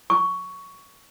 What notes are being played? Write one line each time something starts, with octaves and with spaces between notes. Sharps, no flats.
C#6